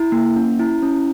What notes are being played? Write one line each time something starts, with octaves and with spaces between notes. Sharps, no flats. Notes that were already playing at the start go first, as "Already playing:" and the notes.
Already playing: E4
A#3
C#4
E4
C#4